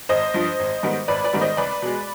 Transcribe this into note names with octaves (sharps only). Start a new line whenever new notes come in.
G#1 C5 D#5
G2 F3
G#1
G#2 D#3 G3 B3
G#1 B4 D5
B4 D5
G#2 D#3 G3 B3
C5 D#5
C2 B4 D5
B2 G#3